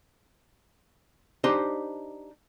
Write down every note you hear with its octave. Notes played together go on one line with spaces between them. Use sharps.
D4 D#4 G4 C5 D#5 C6